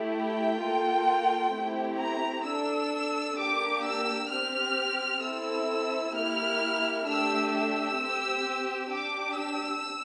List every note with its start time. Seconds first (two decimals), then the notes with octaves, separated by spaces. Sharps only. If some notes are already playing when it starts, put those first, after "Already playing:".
Already playing: A3 E4 G4
0.15 G5
0.62 A#3 F4 A4
1.54 A3 C4 E4 G4
2.00 A#5
2.46 D4 A4 E6
3.38 A#3 D4 G4 D6
3.84 E6
4.30 C4 G4 F6
5.23 C4 E4 A4 E6
6.16 A#3 E4 G4 F6
7.07 A3 D4 G4 E6
7.54 E6
8.00 C4 G4
8.92 D4 G4 D6
9.38 E6